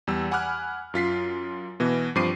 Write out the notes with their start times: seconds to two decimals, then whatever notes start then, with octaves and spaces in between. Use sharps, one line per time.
0.07 E2 G3 E6
0.31 F#5 G#5 B5 D6 F6 F#6
0.94 F#2 F4 B6 C7
1.80 B2 E3 B3
2.15 G2 F3 C4 D6 C7 D#7